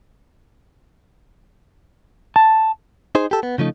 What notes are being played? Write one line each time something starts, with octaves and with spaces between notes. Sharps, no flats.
A5
D#4 G#4 C5
G4 A4
B3
C#3 F3 A3 D#4